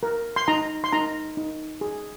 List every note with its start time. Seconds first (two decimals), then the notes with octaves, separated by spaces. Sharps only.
0.03 A#4
0.36 C6
0.48 D#4 A#5
0.84 C6
0.93 D#4 A#5
1.37 D#4
1.81 G#4